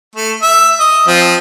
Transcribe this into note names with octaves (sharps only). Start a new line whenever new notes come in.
A3
E5
D#5
F3 C4